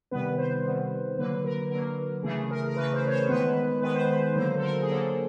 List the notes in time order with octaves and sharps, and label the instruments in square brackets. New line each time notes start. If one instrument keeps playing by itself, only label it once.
[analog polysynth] C3 D#3 G3 B3 B4
C5
C3 D#3 G3 B3
D3 F#3 A#3 B4
A#4
D3 F#3 A#3 A#4
C#3 E3 A3 G#4
A#4
A#4
C#3 E3 A3 B4
C5
C#5
C5
D#3 G#3 B3 B4
D#3 G#3 B3 B4
C5
B4
D3 F#3 A#3 C5
A4
A#4
G#4
D3 F#3 A#3 A4